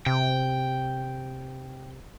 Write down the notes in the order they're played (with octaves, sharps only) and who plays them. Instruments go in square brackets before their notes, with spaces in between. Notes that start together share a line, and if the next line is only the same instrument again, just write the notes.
[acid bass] C3 [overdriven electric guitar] G5